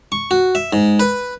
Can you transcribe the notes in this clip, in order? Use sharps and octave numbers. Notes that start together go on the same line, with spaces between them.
C#6
F#4
E5
G#2
B4